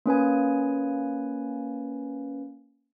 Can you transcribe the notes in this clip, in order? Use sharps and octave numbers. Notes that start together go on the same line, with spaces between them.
A#3 C#4 B4 G#5